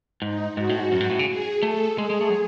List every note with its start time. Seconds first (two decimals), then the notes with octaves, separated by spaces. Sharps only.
0.22 G#2 D#4
0.57 G#2 F#4
0.69 A2
0.80 G#2
0.92 F#2
1.00 G#2
1.10 A2
1.19 C#3
1.28 G#4
1.63 A3 A4
1.98 G#3 G#4
2.10 G#3
2.21 A3
2.30 F#3